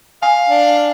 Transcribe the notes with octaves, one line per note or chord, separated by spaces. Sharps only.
F5 G#5
D4